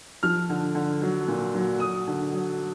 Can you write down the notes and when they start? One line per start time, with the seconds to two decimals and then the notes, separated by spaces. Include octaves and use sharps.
0.23 F3 F6
0.50 D3
0.75 D3
1.02 F#3
1.28 A#2
1.55 F#3
1.80 F#3 D#6
2.07 D3
2.33 F#3